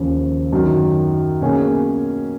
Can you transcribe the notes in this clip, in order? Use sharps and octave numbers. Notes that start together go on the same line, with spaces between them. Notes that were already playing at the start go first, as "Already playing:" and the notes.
Already playing: D#2 C#3 F3
F#2 D#3 F#3
B2 A#3 C#4 G#4